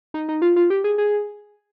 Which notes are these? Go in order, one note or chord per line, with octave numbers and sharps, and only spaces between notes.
D#4
D#4
F4
F4
G4
G#4
G#4